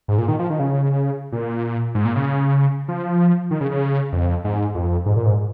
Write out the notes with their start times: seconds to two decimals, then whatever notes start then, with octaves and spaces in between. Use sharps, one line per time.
0.08 G#2
0.18 A#2
0.28 D#3
0.39 F3
0.50 D#3
0.59 C#3
1.32 A#2
1.95 G#2
2.05 A#2
2.16 C#3
2.88 F3
3.51 D#3
3.61 C#3
3.71 C#3
4.13 F2
4.44 G#2
4.75 F2
5.06 G#2
5.16 A#2
5.26 G#2